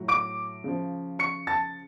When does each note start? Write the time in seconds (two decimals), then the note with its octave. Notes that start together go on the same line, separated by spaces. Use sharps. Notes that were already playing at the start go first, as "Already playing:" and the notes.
Already playing: A2 F#3
0.08 D6 D7
0.64 C#3 F3
1.19 C#6 C#7
1.47 A5 A6